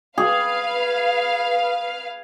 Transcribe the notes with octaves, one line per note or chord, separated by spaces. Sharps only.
G#4 B4 F5